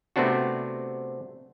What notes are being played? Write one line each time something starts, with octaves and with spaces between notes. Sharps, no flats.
C3 A3 B3 C4 D4 F#4